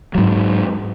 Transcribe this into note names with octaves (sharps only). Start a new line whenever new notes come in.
G#2 F#3